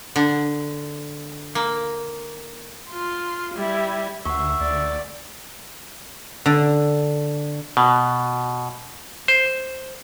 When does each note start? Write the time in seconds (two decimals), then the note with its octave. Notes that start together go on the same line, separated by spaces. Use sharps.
0.16 D3
1.55 A#3
2.90 F4 C6
3.54 G3 E4
4.25 D2 E5 F#5 C#6
4.60 D2 D5
6.46 D3
7.77 B2
9.28 C5